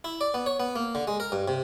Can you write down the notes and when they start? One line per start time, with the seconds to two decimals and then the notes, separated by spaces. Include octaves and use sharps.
0.04 E4
0.21 D5
0.34 B3
0.46 C#5
0.60 B3
0.76 A#3
0.95 D3
1.07 G#3
1.20 A#4
1.32 G2
1.48 C3